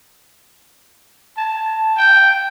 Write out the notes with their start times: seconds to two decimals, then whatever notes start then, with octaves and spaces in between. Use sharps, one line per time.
1.37 A5
1.97 G5